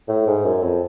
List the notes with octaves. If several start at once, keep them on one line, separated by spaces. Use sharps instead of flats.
A2
G#2
F#2
F2